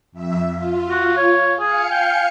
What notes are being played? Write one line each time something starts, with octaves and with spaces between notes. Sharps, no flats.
F2 E5
F4
F#4
C#5
G#4 F5 G#5 C#7
G5